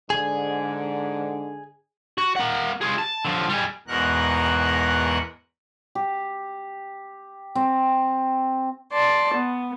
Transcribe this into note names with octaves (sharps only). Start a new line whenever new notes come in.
G#2 D3 G#4
F#4
A#3 F#5
F4 G#4
A5
D3 F3
G3 G#4
E2 G#2 B2 A#4 F#5 F#6
G4
C4
D5 A5 C6
B3